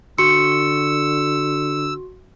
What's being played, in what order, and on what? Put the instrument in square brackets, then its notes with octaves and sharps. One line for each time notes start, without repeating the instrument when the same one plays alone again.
[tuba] D3 [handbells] F#4 C6 [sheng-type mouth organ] E6 [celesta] C#7